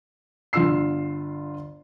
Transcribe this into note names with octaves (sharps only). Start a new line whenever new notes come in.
G1 D3 F4 C6 E6 C7